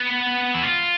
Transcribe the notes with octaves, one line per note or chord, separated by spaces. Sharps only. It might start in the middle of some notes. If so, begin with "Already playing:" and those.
Already playing: B3
E4
F4